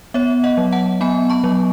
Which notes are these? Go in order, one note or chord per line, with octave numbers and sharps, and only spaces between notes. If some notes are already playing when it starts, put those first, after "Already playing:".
B3 C#5 E5
D#5 F#5
F#3
F#5 A5
B3 G#5 B5
A5 C#6
F#3